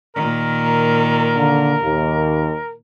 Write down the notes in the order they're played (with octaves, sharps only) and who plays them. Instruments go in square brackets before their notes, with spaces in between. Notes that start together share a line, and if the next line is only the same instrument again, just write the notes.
[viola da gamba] A#2 D#3 [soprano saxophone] A#4
[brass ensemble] D3 A#3
D#2 A#3